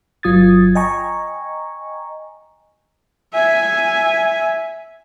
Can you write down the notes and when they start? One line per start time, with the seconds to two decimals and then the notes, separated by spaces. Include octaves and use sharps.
0.23 G1 F#3 F4 D#6 G#6 A6
0.75 D#5 G5 G#5 A#5 C#6
3.34 E5 G#5